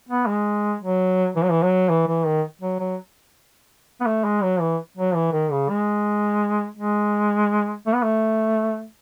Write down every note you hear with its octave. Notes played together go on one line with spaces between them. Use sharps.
B3
G#3
F#3
E3
F#3
E3
F#3
E3
E3
D#3
F#3
F#3
B3
A3
G#3
F#3
E3
F#3
E3
D#3
C#3
G#3
G#3
A3
B3
A3